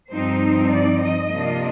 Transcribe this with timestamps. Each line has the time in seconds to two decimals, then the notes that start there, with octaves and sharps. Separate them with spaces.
0.11 G2 F3 C4 D#4 C5
0.72 D5
1.01 D#5
1.32 C3 F3 A#3 D4 F4